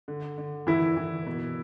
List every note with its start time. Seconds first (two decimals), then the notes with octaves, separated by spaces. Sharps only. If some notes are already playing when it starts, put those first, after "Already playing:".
0.08 D3
0.38 D3
0.67 E3 E4
0.97 E3
1.26 B2